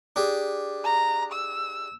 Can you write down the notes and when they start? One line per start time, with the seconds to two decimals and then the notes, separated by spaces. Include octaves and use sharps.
0.16 D4 G4 G#4
0.84 A#5
1.32 E6